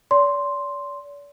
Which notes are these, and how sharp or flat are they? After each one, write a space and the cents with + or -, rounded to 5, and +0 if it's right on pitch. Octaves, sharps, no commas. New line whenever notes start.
D5 -40 C6 +0